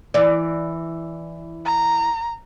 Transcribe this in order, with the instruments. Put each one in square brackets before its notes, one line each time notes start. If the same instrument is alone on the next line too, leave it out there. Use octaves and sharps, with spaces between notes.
[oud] E3 D5
[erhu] A#5